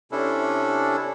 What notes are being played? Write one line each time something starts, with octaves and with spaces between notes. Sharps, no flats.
C3 C#4 D4 E4 A4